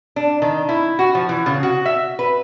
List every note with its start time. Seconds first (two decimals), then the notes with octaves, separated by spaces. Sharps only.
0.16 D4
0.42 D#3
0.69 E4
0.99 F#4
1.15 F3
1.29 E3
1.46 C#3
1.63 F#4
1.86 E5
2.19 B4